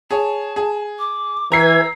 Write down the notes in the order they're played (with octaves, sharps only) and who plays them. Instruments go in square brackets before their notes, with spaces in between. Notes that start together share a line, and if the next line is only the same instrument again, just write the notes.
[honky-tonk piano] G#4 C#5 [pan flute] A5
[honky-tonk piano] G#4
[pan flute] D6
[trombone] E3 [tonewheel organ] B4 G#5 G#6 [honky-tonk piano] A#5 C7 [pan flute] E6